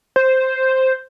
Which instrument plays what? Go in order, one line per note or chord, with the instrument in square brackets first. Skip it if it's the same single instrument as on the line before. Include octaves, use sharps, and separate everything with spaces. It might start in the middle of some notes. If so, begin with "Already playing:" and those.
[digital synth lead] C5